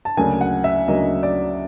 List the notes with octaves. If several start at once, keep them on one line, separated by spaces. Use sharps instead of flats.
A5
D2 C#3 F#3 A#3 G#5
F#5
E5
D2 C#3 F#3 A#3 D#5
D5